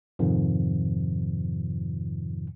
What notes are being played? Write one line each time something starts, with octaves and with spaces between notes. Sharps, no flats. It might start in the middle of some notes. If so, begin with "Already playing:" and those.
F2 G#2 C3 D#3 F3